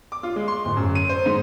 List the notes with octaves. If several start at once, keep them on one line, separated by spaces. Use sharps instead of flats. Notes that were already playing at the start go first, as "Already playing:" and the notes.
D6
F4
G#3
C6
D1
F#2
D#7
C5
G#2